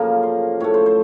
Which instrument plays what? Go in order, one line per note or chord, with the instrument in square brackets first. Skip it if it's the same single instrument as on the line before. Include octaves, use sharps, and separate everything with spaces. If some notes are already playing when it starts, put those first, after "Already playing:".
Already playing: [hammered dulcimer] F#2 C#3 F3 A#3 A4
C5
A2 A3 C#5
C5
C5